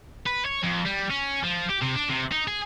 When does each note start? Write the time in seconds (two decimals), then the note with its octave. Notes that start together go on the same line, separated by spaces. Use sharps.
0.26 B4
0.45 C#5
0.63 F2
0.86 G3
1.10 C#4
1.43 F3
1.69 G4
1.81 C3
1.95 D4
2.09 C3
2.32 D#4
2.48 G#4